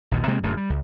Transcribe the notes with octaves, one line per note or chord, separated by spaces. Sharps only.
A#1 D#2 B2
C3 G#3 A#3 C4
D1 F#2 A3
G3
C#2